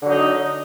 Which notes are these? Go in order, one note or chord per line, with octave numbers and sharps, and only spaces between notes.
D3 F#3 D#4